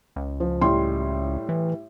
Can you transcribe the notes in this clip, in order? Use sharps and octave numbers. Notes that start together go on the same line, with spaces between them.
C#2
F3
A2 G3 C6
E3